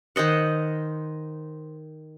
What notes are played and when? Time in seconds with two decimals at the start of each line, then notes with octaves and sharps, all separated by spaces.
0.16 D#3 C5 D#5 F#5